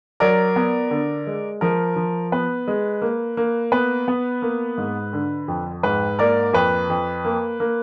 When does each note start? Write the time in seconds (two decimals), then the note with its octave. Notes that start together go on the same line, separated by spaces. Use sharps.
0.20 F#3 A#4 D5
0.56 B3
0.90 D3
1.27 G#3
1.61 F3 A#4
1.96 F3
2.32 B3 B4
2.68 G#3
3.02 A#3
3.37 A#3
3.72 B3 B4
4.08 B3
4.42 A#3
4.78 G#2
5.13 D3
5.48 F2
5.83 G#2 B4
6.19 A#3 A#4 D5
6.53 F2 B4
6.90 F2
7.25 A#3
7.60 A#3